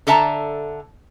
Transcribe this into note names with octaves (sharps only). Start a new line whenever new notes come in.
D3 A4 E5 A5 A#5